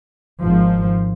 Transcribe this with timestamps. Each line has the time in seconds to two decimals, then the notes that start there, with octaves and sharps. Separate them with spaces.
0.42 G#1 G#2 F3